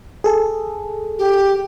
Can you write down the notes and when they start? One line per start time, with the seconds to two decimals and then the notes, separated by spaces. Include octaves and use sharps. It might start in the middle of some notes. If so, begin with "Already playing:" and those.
0.24 G#4 A4
1.19 G4